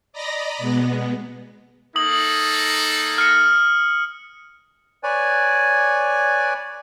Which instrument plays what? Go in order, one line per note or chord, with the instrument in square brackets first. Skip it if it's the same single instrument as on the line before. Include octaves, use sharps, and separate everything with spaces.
[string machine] D5 D#5 A#5 B5 A#6
B2 G#3 B3
[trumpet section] A#3 D#4 A4 [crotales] D#6 F#7
[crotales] F6 C#7
[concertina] B4 C#5 D5 G#5